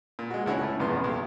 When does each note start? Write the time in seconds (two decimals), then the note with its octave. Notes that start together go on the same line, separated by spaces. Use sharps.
0.19 A#2
0.30 G#3 F#4
0.46 C#2 D3 E4 C#5 F#5
0.63 A3
0.80 A#1 E2 G2 C3 B3 C6
1.04 B1 G4